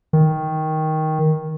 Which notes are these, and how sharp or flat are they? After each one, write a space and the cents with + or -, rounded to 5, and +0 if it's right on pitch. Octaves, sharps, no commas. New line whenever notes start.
D#3 +10